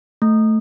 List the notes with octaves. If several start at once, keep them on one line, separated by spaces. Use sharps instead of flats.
A3